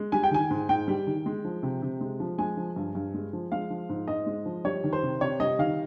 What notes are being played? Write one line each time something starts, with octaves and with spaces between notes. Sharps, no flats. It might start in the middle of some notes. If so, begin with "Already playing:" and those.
Already playing: G#3
G3 G#5
G5
D#3 G#5
G#2
G#2 G5
G3
D#3
G#3
F3
C3
C3
G#3
F3
G#3 G#5
F3
G2
G2
G#3
F3
G#3 F5
F3
G#2
G#2 D#5
G#3
F3
G3 C#5
D#3
C5
C3
C3 C#5
G3 D#5
D#3 F5